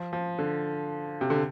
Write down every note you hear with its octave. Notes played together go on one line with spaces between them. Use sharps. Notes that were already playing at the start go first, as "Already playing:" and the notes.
Already playing: F3
F3
D3
C3
D3